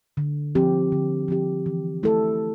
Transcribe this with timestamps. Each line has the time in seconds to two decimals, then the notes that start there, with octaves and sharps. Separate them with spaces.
0.17 D3
0.55 F3 C4 G4
0.92 D3
1.28 F3 C4 G4
1.66 E3
2.03 A3 E4 A4